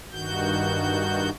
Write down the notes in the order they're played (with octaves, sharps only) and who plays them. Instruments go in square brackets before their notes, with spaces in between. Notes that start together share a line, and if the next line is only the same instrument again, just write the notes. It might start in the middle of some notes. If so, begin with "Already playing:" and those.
[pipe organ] G2 D#3 F#4 G6